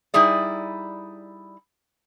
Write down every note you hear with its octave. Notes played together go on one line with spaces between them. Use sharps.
G3 D#4 E4 G#4 D5